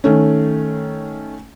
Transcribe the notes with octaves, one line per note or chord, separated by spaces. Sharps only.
D#3 A3 C#4